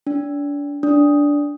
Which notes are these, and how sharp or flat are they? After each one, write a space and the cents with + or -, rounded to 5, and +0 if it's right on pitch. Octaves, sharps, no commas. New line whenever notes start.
D4 -35
D4 -10